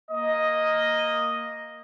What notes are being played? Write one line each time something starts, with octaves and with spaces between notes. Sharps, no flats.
A#3 D#5